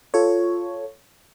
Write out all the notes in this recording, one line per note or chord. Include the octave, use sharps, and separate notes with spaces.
F4 A4 C#5